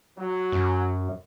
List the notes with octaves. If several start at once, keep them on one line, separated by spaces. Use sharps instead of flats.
F#3
F#2